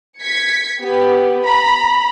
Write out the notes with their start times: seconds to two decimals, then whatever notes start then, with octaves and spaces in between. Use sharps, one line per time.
0.21 G#6 B6 C#7
0.81 B3 G4
1.44 A#5 B5